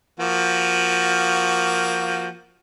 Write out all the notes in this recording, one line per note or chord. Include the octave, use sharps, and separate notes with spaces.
F3 A#3 F#4